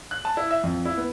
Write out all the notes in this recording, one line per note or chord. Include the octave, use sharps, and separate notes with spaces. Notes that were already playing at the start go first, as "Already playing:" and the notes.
F#6
A5
E4
E5
F2
E4
B3